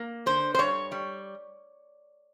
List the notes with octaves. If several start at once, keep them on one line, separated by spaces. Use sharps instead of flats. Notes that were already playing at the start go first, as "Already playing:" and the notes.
Already playing: A#3
D3 C5
C5
G2 C#5
G3